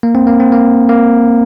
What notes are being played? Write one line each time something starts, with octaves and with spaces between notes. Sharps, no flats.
A#3
C4
A#3
C4
A#3
A#3